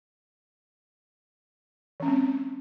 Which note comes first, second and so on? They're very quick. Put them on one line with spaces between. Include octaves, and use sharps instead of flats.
E3 C#4 G#3 C4